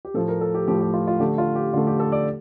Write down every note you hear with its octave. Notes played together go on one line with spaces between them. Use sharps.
G4
A2 F3 A3 A4
A#4
A4
G4
A2 F3 A3 G4
A4
G4
F4
F4
D3 A3 G4
F4
G4
D3 A3 F4
G4
A4
D5